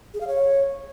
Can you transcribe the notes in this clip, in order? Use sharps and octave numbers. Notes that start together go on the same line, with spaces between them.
G#4
F5
C#5